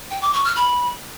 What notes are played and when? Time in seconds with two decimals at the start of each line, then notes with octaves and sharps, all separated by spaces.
0.11 G5
0.22 D6
0.33 C#6
0.45 F6
0.56 B5